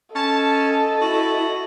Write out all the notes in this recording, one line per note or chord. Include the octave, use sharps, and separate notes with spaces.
C#4 A4 D#5 A5
E4 F#4